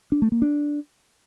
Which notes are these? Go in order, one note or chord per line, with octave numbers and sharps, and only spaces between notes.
D4
A3
A#3
D4